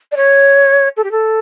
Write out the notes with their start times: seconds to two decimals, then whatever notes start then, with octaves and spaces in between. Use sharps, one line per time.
0.12 D5
0.16 C#5
0.97 A4
1.04 G4
1.11 A4